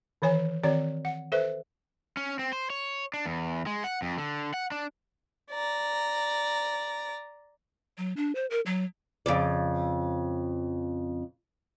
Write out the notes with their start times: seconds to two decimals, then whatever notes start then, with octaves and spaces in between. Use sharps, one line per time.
0.22 D#3 E3 C#5 G#5
0.64 D#3 C4 F#4 C#5 D5
1.05 F#5
1.32 A4 B4 C5 E5
2.17 C#4
2.39 C4
2.53 C5
2.70 C#5
3.14 D4
3.26 E2
3.67 G#3
3.84 F#5
4.02 F2
4.18 D3
4.54 F#5
4.72 D4
5.51 D5 A#5
7.98 F#3
8.17 D4
8.35 C5
8.50 A#4
8.66 F#3
9.26 F2 C#3 D5